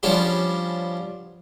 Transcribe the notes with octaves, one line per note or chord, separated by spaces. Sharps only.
F3 G3 B3 C#4 D4 G4